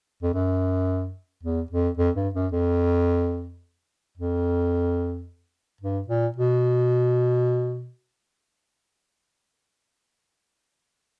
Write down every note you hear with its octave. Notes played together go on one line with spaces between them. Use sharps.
F2
F#2
E2
F2
F2
G2
F#2
F2
F2
G2
A#2
B2